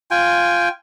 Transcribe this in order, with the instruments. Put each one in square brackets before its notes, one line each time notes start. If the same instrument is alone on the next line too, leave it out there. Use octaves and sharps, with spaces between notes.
[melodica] F4 G5 G#5